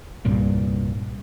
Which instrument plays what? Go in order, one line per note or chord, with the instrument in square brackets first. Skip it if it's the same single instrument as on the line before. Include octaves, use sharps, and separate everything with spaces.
[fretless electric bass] C2 G2 A#2